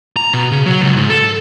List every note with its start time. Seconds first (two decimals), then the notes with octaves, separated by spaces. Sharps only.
0.16 A#5
0.34 B2
0.52 C#3
0.66 F#3
0.81 C#2
0.97 G#2
1.10 A4